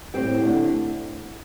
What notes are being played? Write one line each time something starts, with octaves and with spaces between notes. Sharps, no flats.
A2 G3 C4 G4
D3 A3 D4